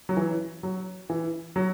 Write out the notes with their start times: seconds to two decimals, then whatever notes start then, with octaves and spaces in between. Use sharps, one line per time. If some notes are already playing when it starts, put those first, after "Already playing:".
0.09 F#3
0.17 E3
0.63 F#3
1.10 E3
1.56 F#3